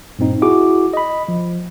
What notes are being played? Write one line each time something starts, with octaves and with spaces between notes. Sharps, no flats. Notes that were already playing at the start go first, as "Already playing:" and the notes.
G2 A#2 C4 D#4
E4 F#4 G#4 D6
D#5 B5
F3